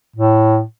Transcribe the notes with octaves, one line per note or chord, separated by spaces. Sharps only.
A2